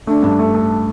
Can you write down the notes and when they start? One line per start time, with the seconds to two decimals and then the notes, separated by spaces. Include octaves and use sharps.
0.07 A3 D4
0.23 G2
0.39 A3
0.54 A3